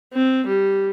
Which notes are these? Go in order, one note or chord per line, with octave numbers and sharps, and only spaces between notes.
C4
G3